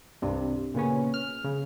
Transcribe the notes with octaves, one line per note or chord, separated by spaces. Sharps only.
C2 G2 C3 G3
A#2 C#3 B3 C#4
F6
C#3